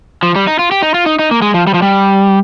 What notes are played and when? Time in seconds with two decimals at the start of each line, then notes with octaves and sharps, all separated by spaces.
0.23 F3
0.36 G3
0.47 D#4
0.59 F4
0.71 G4
0.82 D#4
0.94 F4
1.06 D#4
1.19 D#4
1.31 A#3
1.42 G#3
1.54 F3
1.67 G3
1.74 F3
1.82 G3